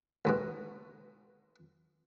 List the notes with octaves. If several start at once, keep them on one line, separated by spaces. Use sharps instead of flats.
D2 G#2 B2